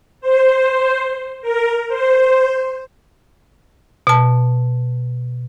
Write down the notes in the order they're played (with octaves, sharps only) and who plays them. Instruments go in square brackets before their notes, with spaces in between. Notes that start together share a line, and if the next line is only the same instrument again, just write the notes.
[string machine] C5
A#4
C5
[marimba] B2 A5